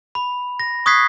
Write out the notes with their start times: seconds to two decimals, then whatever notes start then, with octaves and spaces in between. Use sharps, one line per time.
0.15 B5
0.60 A#6
0.86 C#6 D#6 F#6 G#6 B6 C7